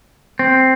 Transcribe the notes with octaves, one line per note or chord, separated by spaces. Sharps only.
C4